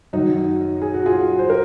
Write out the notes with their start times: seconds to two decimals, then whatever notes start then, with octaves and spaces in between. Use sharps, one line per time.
0.13 F#2 D#3 D#4 F#4
0.82 G#4
0.94 F#4
1.06 F4 G#4
1.39 C5
1.50 A#4